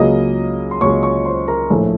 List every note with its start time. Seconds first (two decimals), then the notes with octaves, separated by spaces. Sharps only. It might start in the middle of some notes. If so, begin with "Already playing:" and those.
Already playing: C#2 C#3 F#3 A#3 D#5 D#6
0.71 C6
0.80 C#2 C#3 F#3 A#3 C#5 C#6
1.03 C#5 C#6
1.25 C5 C6
1.48 A#4 A#5
1.70 A#1 A2 F3 A3